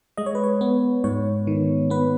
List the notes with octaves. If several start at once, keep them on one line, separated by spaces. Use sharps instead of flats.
G#3 D#5
C#5
B4
C#5
B3
G#2 C#5
D#3
B3 B4